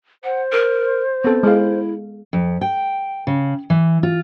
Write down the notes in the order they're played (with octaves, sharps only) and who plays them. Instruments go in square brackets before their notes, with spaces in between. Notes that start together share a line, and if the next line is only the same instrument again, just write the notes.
[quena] C5 [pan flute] F#5
[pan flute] A#4
[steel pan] B3 A4 [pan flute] C4
[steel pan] G#3 F5 [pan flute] E4
[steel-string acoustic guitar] F2
G5
C#3
E3
F4